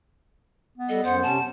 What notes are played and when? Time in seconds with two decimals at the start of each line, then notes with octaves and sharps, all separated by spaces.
0.78 B3
0.89 G3 A4 D#5
1.04 F#2 C5 F#5
1.23 C3 C#4 A5